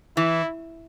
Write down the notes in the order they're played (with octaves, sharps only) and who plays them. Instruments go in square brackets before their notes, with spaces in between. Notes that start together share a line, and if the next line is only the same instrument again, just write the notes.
[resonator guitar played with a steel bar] E3 [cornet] E4